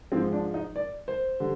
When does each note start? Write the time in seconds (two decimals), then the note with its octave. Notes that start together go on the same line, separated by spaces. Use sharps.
0.12 G#2 F3 G#3 C4
0.33 D4
0.54 D#4
0.76 D5
1.08 C5
1.40 D3 G3